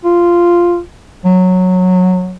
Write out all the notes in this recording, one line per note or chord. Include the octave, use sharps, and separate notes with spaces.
F4
F#3